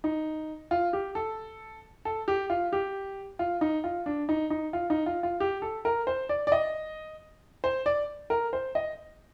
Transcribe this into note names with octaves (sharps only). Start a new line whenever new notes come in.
D#4
F4
G4
A4
A4
G4
F4
G4
F4
D#4
F4
D4
D#4
D#4
F4
D#4
F4
F4
G4
A4
A#4
C5
D5
D5
D#5
C5
D5
A#4
C5
D#5